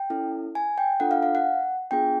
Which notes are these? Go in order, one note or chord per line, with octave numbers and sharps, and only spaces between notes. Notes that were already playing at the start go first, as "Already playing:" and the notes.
Already playing: G5
C#4 E4 A4
G#5
G5
D4 F4 A4 F#5
F5
F5
F#5
B3 D4 F4 G#4 G5